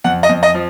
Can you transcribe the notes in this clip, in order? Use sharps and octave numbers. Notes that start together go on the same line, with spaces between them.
F2 F#5
D#5
F2
D#5
F3